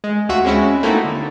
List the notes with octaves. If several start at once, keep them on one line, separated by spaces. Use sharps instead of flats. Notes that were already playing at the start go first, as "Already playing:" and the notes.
G#3
D2 F4 F#4 E5
G#3 C4 C#4 E4 F#4
A3 A#3 C4 D#4 E4 F#4
D3